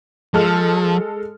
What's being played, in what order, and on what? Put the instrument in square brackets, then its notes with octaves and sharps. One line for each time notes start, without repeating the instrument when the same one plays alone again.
[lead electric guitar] F3 [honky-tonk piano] G#3 A4 F6